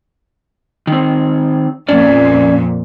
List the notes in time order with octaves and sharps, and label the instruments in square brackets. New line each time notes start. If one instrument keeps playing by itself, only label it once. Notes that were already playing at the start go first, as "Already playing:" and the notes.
[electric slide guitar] D#3 C4
[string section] F2 A#2 [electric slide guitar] C#4 D5